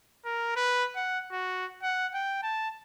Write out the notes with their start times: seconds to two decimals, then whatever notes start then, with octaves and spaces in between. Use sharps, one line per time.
0.25 A#4
0.56 B4
0.96 F#5
1.32 F#4
1.83 F#5
2.14 G5
2.43 A5